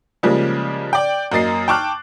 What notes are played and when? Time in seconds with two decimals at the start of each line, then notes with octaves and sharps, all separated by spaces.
0.23 C#3 F3 G3 G#3 A#3
0.93 D5 G5
1.32 F#2 A#3 D#5 A6 C7
1.68 G5 A5 C#6 D6 F6 F#6